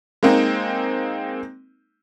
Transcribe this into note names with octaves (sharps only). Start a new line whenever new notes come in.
G#3 A#3 C4 D#4